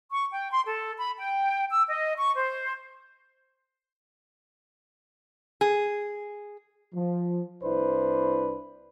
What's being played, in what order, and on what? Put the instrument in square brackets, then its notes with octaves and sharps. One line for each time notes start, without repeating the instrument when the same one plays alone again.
[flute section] C#6
G5
C6
A4
B5
G5
E6
D#5
C#6
C5
[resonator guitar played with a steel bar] G#4
[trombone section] F3
C2 D4 E4 B4 C5